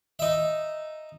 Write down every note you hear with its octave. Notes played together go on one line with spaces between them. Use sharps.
D#4 E5